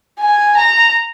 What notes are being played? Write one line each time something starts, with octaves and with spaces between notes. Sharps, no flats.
G#5
A#5